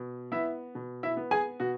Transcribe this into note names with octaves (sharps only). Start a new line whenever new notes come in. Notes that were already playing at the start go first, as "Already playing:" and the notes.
Already playing: B2
B3 E4 E5
B2
E4 E5
B3
G#4 G#5
B2 F#4